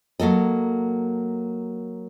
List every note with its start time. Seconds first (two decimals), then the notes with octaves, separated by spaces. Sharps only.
0.20 F#3 A#3 A4 D#5